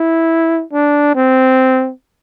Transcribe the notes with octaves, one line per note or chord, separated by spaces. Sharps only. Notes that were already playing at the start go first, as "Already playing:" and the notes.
Already playing: E4
D4
C4